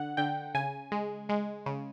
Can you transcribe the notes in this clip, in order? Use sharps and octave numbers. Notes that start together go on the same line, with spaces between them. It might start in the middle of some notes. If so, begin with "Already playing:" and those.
Already playing: D3 F#5
D3 G5
C#3 G#5
G#3
G#3
C#3